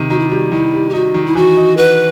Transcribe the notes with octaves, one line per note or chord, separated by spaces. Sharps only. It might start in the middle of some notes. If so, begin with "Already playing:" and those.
Already playing: C3 D#3
D#3 F#4
E4
G3 F#4
D#3 E4
G3
G4
D#4 F#4
D#3
E4
E3 F#4
D#4
F#4 B4